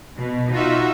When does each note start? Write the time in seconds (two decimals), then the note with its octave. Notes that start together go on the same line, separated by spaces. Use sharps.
0.17 B2
0.53 D#4 F4 F#4 E5